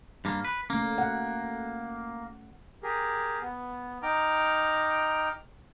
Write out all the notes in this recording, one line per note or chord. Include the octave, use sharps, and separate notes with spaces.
G2 A#3
B4
A3 A#3 C#4
F#5
G4 G#4 A#4
B3
D#4 G5 A#5 D6 F6